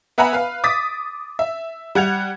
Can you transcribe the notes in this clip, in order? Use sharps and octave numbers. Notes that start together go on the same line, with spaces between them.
B3 E5 F#5 G#5 A#5 B5
B4 F5
D6 D#6 A6 B6
E5
G3 F#5 G#6 F7